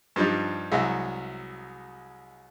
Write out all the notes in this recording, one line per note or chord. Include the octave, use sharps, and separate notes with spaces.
G2 F3 G3 D4 D#4
C2 F#3 G#3 F#4 E5